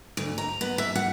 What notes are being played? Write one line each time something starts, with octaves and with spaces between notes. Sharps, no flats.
D2
A#5
B3
E5
F#5